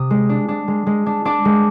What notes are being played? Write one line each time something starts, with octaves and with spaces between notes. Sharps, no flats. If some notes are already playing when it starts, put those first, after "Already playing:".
Already playing: C3 D#6
G#3
D4
D4
G#3
G#3
D4
D4 D6
G#3